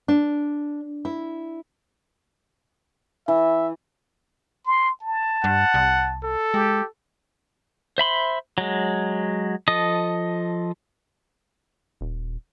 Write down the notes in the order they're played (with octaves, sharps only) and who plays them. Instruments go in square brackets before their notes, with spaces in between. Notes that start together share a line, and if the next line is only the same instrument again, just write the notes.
[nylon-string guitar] D4
E4
[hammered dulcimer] E3 [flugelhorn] E5
[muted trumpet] C6
A5
[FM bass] G2 [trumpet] F#5
[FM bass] C2
[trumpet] A4
[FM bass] G#3 [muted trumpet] G4
[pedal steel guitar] C5 E5 B5 C6
F#3 G#3
F3 A4 D#5 D#6
[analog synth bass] D#1